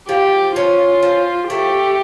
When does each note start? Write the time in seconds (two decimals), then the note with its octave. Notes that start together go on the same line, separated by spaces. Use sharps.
0.09 F3 G4
0.56 C#4 F4
1.03 F3
1.50 A3 G4